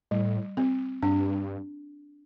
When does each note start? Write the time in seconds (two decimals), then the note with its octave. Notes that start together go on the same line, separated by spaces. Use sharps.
0.11 A2 G3
0.57 C4
1.02 G2 D4